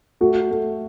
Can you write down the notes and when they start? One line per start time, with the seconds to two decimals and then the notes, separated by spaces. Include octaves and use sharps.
0.21 A3 F#4
0.51 A3